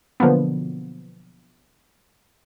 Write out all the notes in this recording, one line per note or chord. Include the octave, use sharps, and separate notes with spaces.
B2 D3 F3 F#3 A#3 B3